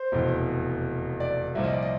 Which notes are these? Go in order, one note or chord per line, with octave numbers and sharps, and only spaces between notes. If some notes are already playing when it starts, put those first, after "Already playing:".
Already playing: C5
F1 E2 B2
D5
C2 A#2 F3 E5
D#5
D5
D#5